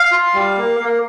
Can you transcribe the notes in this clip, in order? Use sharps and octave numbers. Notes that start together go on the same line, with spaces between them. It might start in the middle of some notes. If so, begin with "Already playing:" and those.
Already playing: F5
F4
G3
A#3
A#3